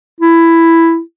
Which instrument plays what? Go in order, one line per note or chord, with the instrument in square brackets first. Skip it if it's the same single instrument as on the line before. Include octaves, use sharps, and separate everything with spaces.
[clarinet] E4